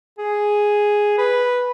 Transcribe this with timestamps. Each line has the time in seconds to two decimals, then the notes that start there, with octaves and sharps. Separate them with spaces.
0.18 G#4
1.18 B4